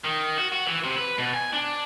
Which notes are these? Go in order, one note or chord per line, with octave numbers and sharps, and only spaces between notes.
D#3
F#4
F#4
E3
C3
B4
B2
G#5
D4